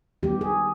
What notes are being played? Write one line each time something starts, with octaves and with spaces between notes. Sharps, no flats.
D#3 G3 B3 G4
G#4